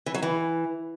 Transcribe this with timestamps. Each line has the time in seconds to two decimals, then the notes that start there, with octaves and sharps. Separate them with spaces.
0.06 E3
0.14 F#3
0.22 E3